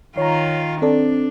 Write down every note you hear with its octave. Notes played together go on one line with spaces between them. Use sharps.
D#3 F4 C#5 A#5
C4 D4 A4 D5